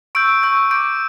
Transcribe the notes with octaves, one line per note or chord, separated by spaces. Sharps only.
C#6 E6 G6 D7
C#6 E6 G6
D6 G6 D7